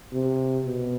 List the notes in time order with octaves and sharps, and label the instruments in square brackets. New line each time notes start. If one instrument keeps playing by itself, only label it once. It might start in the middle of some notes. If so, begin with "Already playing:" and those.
[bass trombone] C3
B2